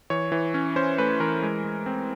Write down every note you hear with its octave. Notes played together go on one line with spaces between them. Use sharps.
E3 C#5
E3
C#4
C#4 C5
A3 B4
E3 A#4
G#3
G#3
C4